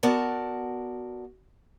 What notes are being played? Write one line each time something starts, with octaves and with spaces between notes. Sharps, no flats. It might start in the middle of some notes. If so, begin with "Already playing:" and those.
B3 F#4 A#4 D5 A5